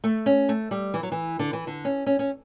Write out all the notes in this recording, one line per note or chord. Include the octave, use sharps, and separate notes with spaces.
A3
C#4
A3
G3
E3
F#3
E3
D3
E3
D3
C#4
C#4
C#4